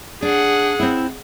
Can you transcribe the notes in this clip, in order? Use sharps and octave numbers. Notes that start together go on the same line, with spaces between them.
D4 G#4 F#5
C4 E4